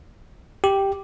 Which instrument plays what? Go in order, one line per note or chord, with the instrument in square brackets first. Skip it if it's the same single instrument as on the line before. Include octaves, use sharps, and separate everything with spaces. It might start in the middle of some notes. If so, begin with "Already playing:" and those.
[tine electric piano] G4